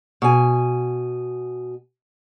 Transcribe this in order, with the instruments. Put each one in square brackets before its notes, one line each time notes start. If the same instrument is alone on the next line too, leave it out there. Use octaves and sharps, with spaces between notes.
[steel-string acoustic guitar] B2 G#5